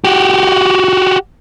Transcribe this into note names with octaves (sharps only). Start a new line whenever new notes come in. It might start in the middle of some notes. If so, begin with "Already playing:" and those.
F#4 G4